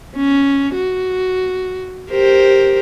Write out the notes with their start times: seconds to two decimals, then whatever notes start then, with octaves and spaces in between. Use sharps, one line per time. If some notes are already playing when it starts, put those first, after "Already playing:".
0.16 C#4
0.75 F#4
2.10 G4 A#4 C5